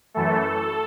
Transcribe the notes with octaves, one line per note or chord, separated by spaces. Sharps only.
F#2 E3 A3 A4